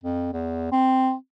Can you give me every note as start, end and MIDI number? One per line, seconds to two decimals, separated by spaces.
0.03 0.32 41
0.33 0.68 40
0.72 1.14 60